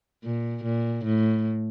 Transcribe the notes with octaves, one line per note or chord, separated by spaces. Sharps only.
A#2
A#2
A2